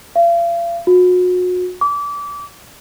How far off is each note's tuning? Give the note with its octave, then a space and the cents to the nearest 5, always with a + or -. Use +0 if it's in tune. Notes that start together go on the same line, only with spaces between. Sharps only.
F5 -40
F#4 -35
D6 -30